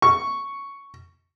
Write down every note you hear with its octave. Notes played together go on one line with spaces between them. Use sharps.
C#6